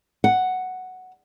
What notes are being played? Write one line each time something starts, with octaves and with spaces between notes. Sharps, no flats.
F#5